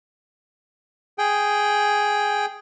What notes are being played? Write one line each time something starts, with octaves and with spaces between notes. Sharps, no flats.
G#4 G5